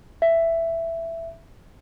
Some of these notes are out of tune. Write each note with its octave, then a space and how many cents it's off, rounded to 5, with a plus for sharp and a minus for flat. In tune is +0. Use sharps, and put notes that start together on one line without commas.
E5 +10